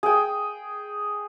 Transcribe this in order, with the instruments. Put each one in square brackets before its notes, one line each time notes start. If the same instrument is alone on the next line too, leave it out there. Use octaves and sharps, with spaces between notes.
[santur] G#4 G5